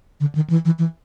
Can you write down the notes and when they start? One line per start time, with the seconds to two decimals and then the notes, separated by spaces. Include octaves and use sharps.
0.20 D3
0.35 D#3
0.50 E3
0.65 E3
0.79 E3